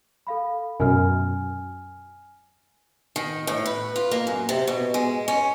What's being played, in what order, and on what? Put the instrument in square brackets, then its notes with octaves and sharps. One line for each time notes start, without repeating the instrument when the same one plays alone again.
[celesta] A4 F5 B5
[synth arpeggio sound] F#2 B2 [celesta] G#5 F6
[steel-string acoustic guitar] D#3
A2
B4
F4
A#3
F#2
C3
B2
G#3
C#4